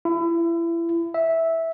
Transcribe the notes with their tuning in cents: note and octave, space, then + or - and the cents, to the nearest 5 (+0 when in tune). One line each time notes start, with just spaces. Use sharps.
E4 +30
E5 -10